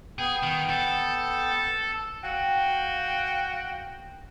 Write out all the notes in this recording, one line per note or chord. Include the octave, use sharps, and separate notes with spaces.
B3 G#4 G5
D#3
A4
F#4 F5 G5